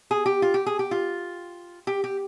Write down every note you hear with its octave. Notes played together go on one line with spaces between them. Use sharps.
G#4
G4
F4
G4
G#4
G4
F4
G4
G4